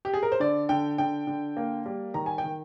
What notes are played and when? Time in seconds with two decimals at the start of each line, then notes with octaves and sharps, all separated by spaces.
0.05 G4
0.14 G#4
0.23 A#4
0.32 C5
0.40 D3 D5
0.69 D3 G5
0.98 D3 G5
1.27 D3
1.57 A#3
1.86 G3
2.14 D#3 A#5
2.26 G#5
2.38 G5
2.44 D#3